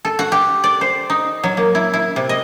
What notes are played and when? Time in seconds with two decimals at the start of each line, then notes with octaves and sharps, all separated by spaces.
0.05 A4
0.19 F#4
0.32 G4
0.64 D5
0.81 C5
1.10 D#4
1.44 F#3
1.57 A#3
1.75 E4
1.93 E4
2.16 C3
2.29 D#5